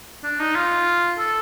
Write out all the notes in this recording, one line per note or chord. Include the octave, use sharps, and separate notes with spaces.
D4
D#4
F4
A4